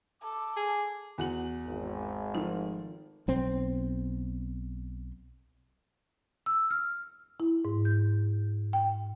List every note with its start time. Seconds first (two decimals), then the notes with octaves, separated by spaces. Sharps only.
0.22 A4 D6
0.57 G#4
1.18 E2 F#4 F#7
1.65 G#1
2.35 F3 A3 D#4
3.28 B1 C4
6.46 E6
6.71 F6
7.40 E4
7.65 G#2
7.85 G6
8.73 G5